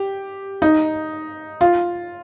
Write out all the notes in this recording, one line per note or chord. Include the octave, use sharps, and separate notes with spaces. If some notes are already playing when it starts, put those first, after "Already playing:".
Already playing: G4
D#4
F4